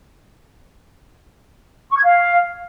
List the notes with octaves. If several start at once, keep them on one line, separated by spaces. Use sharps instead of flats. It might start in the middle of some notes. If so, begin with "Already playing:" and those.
C#6
G#6
F5